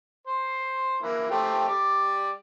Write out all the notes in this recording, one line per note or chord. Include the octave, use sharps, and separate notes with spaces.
C5
E3 A#3 E4
A3 C4 G4
G3 D5